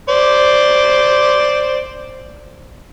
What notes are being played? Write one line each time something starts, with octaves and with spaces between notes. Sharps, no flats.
C5 D5